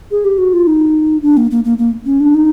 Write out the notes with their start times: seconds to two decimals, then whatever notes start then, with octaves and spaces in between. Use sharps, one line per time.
0.11 G#4
0.25 G4
0.38 F#4
0.53 F4
0.67 D#4
1.22 D4
1.37 A#3
1.51 A#3
1.65 A#3
1.78 A#3
2.06 C#4
2.20 D4
2.34 D#4